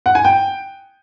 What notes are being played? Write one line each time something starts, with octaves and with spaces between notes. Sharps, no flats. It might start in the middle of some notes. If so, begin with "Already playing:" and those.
F#5
G#5
G5